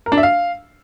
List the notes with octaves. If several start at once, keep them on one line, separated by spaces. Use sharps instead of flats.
A#4
D4
E5
F5